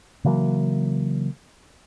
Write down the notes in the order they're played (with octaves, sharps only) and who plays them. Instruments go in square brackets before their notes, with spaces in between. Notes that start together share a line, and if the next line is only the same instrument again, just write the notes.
[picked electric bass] C#3 E3 F#3 A#3